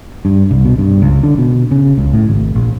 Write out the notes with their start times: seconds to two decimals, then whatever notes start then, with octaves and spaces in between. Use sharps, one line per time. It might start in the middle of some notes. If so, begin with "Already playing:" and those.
0.25 G2
0.51 C2
0.65 B2
0.78 G2
1.02 C#2
1.23 D3
1.38 B2
1.71 C#3
1.98 C#2
2.13 A2
2.28 G#1
2.55 A#1